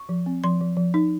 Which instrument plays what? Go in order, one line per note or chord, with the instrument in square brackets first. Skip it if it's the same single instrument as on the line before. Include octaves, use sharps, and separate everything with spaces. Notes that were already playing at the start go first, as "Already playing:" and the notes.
Already playing: [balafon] C#6
F3
C4
F3 C6
F3
F3
D#4